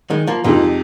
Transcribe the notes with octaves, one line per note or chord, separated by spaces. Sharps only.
D#3 G#3
F3 A#3
F2 C3 F3 G#3 A#3 D#4